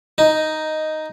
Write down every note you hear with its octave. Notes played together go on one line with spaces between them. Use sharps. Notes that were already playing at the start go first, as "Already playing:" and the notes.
D#4